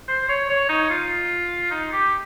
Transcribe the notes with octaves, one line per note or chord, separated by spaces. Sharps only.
C5
C#5
C#5
D#4
F4
D#4
G4